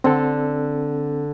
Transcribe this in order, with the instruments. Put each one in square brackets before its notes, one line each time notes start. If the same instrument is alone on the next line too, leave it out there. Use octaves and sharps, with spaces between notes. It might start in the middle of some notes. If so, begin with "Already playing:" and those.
[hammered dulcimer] D3 [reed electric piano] C4 A4